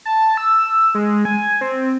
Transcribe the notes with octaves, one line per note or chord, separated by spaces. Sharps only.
A5
E6
G#3
G#5
C4